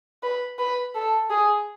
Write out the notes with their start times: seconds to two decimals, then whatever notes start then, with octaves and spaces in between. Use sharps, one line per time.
0.23 B4
0.59 B4
0.95 A4
1.30 G#4